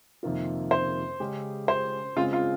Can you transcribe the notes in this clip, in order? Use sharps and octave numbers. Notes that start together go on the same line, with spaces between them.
F2 C3 D#3 A#3 F4
C5
C#3 G#3 C#4 G4
C5
C#3 G#3 C4 F4
F4